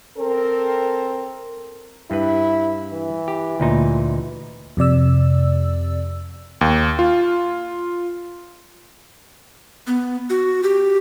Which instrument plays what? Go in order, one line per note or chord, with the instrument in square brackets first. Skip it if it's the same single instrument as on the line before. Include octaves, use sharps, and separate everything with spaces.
[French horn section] C4 A4 A#4
[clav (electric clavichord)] G2 B4 [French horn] E4
[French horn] E3
[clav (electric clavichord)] G4
D2 A#2 D#4
[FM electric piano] F2 C3 D5 E6
[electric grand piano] D#2
F4
[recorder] B3
F#4
G4